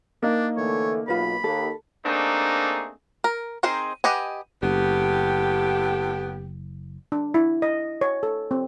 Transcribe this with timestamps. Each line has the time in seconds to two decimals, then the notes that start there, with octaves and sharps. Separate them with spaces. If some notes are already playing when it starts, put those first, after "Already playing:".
0.23 A#3 D4 D#4 A#4
0.57 D3 E3 A3 C#5
1.08 B1 F4 B4 B5
1.44 D#2 A4
2.04 A3 A#3 C4 D4 D#4 G#4
3.24 A#4
3.63 C4 D#4 G#4 A#4 C5
4.04 G4 B4 D#5 F#5 G#5
4.63 F#1 A2 B3 G4
7.12 D4
7.34 E4
7.62 D#5
8.01 C#5
8.23 A4
8.51 C4